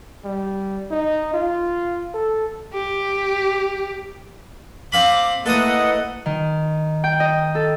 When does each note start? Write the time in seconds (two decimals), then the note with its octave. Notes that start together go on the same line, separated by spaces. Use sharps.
0.24 G3
0.91 D#4
1.34 F4
2.14 A4
2.74 G4
4.92 C4 F5 B5 D6
5.46 A3 A#3 E4 A4 B4 D#5 F#5 D#6
6.26 D#3
7.04 G5
7.20 D#5
7.55 A4